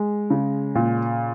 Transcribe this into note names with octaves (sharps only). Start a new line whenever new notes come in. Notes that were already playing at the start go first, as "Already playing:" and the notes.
Already playing: G#3
C#3
A#2